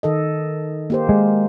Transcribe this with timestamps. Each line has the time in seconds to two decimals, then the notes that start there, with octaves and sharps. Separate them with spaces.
0.03 D#3 A4 D#5
0.90 A#3 G4 C5
1.09 G#3